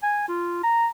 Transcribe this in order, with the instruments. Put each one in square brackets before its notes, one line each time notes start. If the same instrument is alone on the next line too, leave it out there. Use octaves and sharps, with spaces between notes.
[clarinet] G#5
F4
A#5